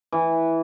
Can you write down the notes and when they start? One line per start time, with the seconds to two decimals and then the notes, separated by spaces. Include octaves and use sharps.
0.12 E3